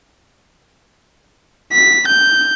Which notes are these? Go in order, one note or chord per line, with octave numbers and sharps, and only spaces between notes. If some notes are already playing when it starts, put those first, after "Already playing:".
B6
G6